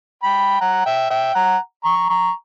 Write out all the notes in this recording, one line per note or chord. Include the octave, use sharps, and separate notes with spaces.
G5 B5
F#5 A#5
E5 G5
E5 G5
F#5 A#5
A#5 C#6
A#5 C#6